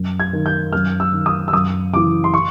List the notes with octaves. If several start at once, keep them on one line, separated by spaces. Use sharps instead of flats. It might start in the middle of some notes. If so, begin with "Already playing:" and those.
Already playing: F#2
G#6
D#3
G6
F#2 F6
E6
D#3
D#6
E6
F#2 D#6
C#3 E3 D6
C6
C#6